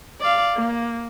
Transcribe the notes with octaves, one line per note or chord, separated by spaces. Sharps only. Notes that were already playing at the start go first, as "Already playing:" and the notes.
D5 F5
A#3